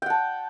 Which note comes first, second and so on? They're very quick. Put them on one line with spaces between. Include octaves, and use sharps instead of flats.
G5 F#5 A5